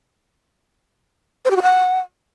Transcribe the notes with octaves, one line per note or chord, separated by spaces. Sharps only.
C5
G4
F#4
F#5